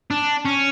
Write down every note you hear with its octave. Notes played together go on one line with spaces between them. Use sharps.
D4
C#4